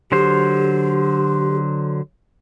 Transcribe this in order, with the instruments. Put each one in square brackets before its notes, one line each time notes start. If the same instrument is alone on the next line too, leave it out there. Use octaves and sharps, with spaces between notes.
[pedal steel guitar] D3 F#3 C5 [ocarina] G4